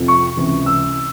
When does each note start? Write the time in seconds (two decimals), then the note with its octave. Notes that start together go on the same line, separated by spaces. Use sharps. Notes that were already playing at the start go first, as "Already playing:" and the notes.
Already playing: F2 C3 F3
0.08 C#6
0.37 C#2 C3 E3
0.66 E6